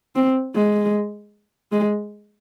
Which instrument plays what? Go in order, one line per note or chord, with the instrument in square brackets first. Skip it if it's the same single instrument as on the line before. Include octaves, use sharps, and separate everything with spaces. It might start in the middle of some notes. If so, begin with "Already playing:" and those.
[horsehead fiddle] C4
G#3
G#3